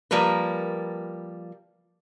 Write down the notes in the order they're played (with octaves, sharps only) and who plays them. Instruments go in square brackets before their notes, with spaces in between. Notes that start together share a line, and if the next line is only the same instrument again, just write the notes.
[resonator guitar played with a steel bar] F3 G3 A#3 A#4 B4